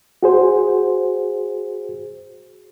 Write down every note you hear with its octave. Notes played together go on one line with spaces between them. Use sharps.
F#4 G#4 C5